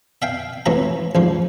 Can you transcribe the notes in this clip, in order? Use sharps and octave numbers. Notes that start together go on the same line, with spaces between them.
E5 F5 G5
C2 A2 E3 E5 A#5
A1 G#2 F3